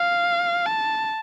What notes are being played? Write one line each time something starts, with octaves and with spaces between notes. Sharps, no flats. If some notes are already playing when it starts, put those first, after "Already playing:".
Already playing: F5
A5